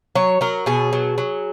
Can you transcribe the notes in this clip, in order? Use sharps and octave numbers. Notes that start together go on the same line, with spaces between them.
F#3 C#5
F#3 A#4
B2 G#4
F#3
F#3